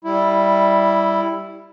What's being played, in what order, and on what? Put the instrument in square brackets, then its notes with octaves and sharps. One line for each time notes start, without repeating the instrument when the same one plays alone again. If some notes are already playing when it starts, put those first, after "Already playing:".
[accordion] G3 E4